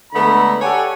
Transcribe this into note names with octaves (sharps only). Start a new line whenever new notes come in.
D3 G#3 A3 B3 A#5 B5
G4 A4 C#5 D5 F#5 G#5